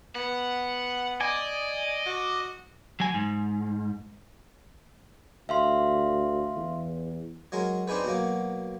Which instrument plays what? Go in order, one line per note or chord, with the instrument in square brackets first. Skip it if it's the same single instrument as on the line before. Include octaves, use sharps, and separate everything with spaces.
[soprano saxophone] B3 [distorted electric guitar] F#5
[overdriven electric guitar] D5 [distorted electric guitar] D#5 [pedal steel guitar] G#5
[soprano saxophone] F#4
[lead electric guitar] F#3 G#5
G#2
[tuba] D2 [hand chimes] E5 F5 C6
[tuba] E2
[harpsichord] F#3 G#3 A#4
C4 D4 D#4 G#4 B4
B2 F#3 A#3